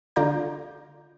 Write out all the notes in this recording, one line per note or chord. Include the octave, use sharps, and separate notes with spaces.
D3 F4 D5 A#5 G6